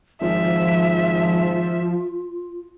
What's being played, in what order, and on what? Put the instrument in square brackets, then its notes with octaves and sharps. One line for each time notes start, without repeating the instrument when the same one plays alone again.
[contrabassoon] G#1 [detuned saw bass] F3 [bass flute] F4 [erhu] E5